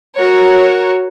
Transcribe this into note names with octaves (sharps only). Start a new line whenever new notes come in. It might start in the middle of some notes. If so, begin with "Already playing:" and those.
F#4 A#4 C#5